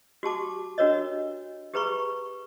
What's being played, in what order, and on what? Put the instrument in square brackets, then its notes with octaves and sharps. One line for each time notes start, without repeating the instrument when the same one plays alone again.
[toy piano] F#4 G4 A5 D6
D4 F#4 A#4 C#5 D#5
G4 G#4 B4 A#5 B5 C#6